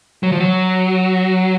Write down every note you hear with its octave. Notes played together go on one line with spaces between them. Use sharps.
F#3
F3
F#3